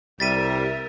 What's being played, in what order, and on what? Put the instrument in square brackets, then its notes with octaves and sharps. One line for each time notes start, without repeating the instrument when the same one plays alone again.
[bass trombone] C2 [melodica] G3 [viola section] G4 A#4 E5 [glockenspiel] A6 B6 D#7